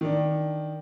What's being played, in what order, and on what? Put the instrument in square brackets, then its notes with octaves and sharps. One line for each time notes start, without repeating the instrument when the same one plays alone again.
[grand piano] D#3 D4